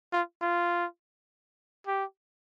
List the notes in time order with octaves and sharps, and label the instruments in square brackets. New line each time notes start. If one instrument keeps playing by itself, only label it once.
[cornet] F4
F4
G4